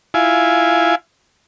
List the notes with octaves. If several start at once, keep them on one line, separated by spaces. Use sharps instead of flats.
E4 F4 G#5